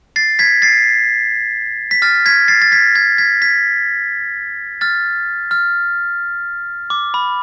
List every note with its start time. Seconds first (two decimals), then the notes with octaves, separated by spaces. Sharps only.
0.16 A6 C7
0.39 G#6 B6
0.62 A6 C7
1.91 B6
2.02 F6 A6
2.26 G#6 B6
2.48 A6 C7
2.62 A6
2.72 G#6 B6
2.95 G#6 B6
3.18 G#6 B6
3.42 G#6 B6
4.81 F6 A6
5.51 F6
6.90 D6
7.14 B5